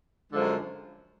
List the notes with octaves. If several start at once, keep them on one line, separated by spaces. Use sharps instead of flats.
F#2 D3 F3 G#3